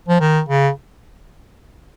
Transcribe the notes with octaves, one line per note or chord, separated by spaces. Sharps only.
F3
D#3
C#3